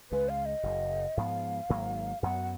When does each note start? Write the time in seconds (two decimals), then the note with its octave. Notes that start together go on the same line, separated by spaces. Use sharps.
0.11 C#2 C#3 G#3 B4
0.29 F5
0.45 D#5
0.63 F#1 F#2 C#3
1.17 G#2 F3 B3 F5
1.69 G#1 G#2 F#3 A#3
2.22 F#2 D#3 F#3 B3 F#5